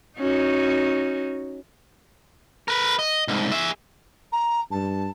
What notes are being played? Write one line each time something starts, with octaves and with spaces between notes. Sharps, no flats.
C#4 D#4 F#4
A#4 B4
D#5
C2 G#2
G#4 E5
A#5
G2 A5